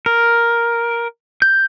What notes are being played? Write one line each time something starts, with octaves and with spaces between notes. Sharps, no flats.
A#4
G6